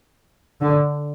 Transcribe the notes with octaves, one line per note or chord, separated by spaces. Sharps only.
D3